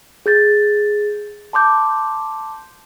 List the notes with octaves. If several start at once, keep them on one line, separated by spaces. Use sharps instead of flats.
G#4 G6 A6
A5 C6 D6 G6